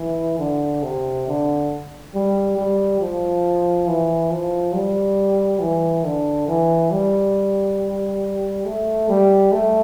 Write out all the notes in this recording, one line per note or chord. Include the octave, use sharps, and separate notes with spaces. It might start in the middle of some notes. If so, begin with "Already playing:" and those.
Already playing: E3
D3
C3
D3
G3
G3
F3
E3
F3
G3
E3
D3
E3
G3
A3
G3
A3